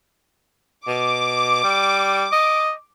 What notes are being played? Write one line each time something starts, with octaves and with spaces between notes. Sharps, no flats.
B2 D6
G3
D#5